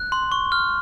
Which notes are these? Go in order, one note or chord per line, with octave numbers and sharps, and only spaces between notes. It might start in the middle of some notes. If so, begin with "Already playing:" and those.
Already playing: F#6
C6
C#6
F6